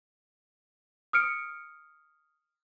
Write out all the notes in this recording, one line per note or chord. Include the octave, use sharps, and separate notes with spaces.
D#6 F6 C#7 D7